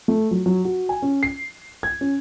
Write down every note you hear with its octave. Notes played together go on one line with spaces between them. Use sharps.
A3
F#3
F#3
F#4
G#5
C#4
C7
G#6
C#4